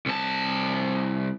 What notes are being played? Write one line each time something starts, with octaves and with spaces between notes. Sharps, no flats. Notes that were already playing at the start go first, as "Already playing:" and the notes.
C2 A5